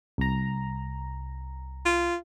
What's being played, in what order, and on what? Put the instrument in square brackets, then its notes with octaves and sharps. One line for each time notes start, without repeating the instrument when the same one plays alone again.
[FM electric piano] C2 A#5
[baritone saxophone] F4